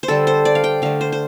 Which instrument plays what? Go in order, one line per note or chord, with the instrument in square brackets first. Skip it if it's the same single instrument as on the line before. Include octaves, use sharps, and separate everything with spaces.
[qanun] C5
D3 G3 A4
C5
D5
F5
G5
D3 A3 F5
C5
C5